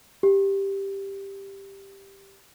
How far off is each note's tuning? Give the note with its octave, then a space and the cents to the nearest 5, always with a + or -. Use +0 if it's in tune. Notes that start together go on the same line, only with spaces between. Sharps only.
G4 +5